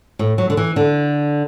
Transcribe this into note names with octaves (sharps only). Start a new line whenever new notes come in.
A2
F#3
D3
E3
D3